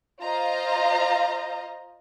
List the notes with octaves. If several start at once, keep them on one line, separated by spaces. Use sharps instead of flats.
F4 C5 D#5 F5 A#5